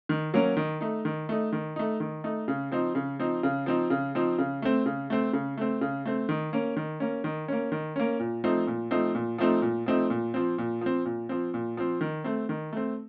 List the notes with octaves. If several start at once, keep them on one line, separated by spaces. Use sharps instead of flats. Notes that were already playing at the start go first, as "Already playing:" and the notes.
D#3
F#3 A#3 C#4
D#3
A3 D#4
D#3
A3 D#4
D#3
A3 D#4
D#3
A3 D#4
C#3
F3 C4 D#4
C#3
F3 C4 D#4
C#3
F3 C4 D#4
C#3
F3 C4 D#4
C#3
A3 C4
C#3
A3 C4
C#3
A3 C4
C#3
A3 C4
D#3
A#3 C#4
D#3
A#3 C#4
D#3
A#3 C#4
D#3
A#3 C#4
A#2
F3 A3 C4 D#4
A#2
F3 A3 C4 D#4
A#2
F3 A3 C4 D#4
A#2
F3 A3 C4 D#4
A#2
F3 C4
A#2
F3 C4
A#2
F3 C4
A#2
F3 C4
D#3
A3 C4
D#3
A3 C4